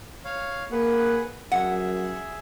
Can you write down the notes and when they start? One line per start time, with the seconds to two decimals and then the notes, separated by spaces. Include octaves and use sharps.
0.25 C#5 F5
0.72 A#3 G#4 B4 F#5
1.52 F#2 G#4 E5 F#5